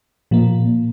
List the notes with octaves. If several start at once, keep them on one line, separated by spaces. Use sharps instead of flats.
A#2 F3 A#3